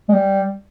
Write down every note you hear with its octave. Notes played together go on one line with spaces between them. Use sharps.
G#3
G3